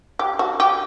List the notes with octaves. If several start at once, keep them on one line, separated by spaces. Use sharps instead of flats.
G4
F#4
G4